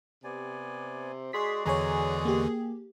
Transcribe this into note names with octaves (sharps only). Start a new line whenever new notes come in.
C3 B3 D5 G#5
G#3 F#4 G#4 D5 C6 B6
E2 D3 E3 G#4 C#5 G#5 A#5
A#3 G4